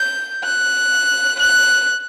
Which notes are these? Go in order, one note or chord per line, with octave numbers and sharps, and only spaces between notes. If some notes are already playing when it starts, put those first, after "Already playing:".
Already playing: G6
F#6
F#6